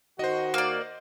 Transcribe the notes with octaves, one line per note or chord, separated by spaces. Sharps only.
D#3 F#4 C5 D#5
A#3 D5